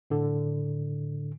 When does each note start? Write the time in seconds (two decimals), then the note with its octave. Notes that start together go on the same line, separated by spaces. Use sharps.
0.10 A2 D3